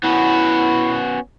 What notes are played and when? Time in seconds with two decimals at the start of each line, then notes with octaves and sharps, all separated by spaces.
0.04 B3 C#4 E4 F#4